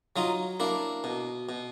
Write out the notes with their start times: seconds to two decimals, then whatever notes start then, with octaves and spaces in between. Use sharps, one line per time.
0.16 F#3 D#4 F4
0.60 A#3 D4 E4
1.04 B2
1.49 B2